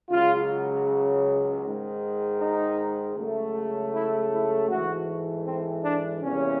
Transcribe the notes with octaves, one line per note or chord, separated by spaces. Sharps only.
C#2 C#3 F#3 F4
G#2 D#3 G#3
D#4
C#2 C#3 F#3 A3
E4
E4
G#2 E3 A3 F#4
C4
D4
E2 C3 E3 G3 A#3 C#4